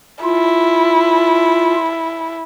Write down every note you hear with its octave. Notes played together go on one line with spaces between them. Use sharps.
E4 F4